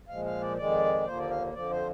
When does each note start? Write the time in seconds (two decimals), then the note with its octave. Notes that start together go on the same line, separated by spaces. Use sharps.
0.08 A#2 F3 G#3 F5
0.25 F5
0.41 D5
0.57 F2 D#3 G#3 D5
1.05 D#2 D3 F3 A#3 C5
1.18 D5
1.30 F5
1.54 F2 D3 F3 D5
1.71 C5